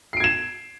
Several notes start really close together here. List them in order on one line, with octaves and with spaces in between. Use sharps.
C7 D7 G#6 E7